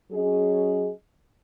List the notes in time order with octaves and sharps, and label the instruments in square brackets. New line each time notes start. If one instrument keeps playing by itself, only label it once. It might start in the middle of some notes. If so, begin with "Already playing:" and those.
[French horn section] F#3 C#4 G#4 D#5